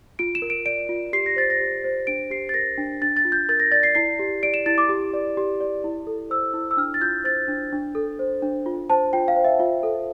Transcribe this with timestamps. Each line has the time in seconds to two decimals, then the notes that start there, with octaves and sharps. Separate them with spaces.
0.19 F4 D7
0.35 E7
0.42 A#4
0.50 D7
0.66 D5 D7
0.89 F4
1.13 G4 C7
1.26 A#6
1.36 C5 A6
1.50 A#6
1.60 G4
1.84 C5
2.07 D4 D7
2.31 G4 C7
2.49 A6
2.54 A#4 A#6
2.78 D4
3.02 D4 A6
3.17 A6
3.25 F4
3.32 G6
3.49 A#4 A6
3.60 A#6
3.72 D5 A6
3.83 C7
3.95 E4 C7
4.19 G4
4.43 D5 D7
4.54 E7
4.66 E4 A6
4.78 D6
4.89 G4
5.14 D5
5.37 G4
5.60 D5
5.84 E4
6.07 A4
6.30 C5 E6
6.54 E4
6.71 E6
6.77 D4 F6
6.94 A6
7.01 F4 G6
7.24 C5 A6
7.48 D4
7.72 D4
7.95 A4
8.19 C5
8.42 D4
8.66 F4
8.90 C5 A5
9.13 F4 G5
9.28 F5
9.36 C5
9.44 E5
9.60 F4
9.83 A4